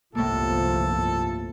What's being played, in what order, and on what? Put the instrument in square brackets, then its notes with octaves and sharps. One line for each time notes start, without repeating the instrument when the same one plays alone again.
[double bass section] G1 C2 F3 [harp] A2 A#3 [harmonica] A4